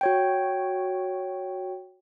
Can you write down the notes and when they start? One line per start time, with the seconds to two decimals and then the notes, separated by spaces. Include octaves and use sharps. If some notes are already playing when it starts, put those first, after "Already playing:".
0.01 F#4 C#5 G5